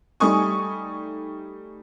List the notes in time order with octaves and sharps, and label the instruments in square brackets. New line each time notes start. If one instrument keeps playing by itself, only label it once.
[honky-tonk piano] G3 A3 D#4 G#5 C#6 D#6